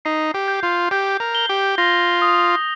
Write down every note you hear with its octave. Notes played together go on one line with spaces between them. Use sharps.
D#4 C7
G4
G6
F4
G4 G6
A#4
G7
G4
F4 A#6
D#6